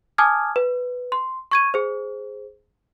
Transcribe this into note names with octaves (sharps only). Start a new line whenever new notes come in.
G#5 A5 D6 D#6 F6 G#6
B4
C6
C#6 G#6 D#7
G#4 C5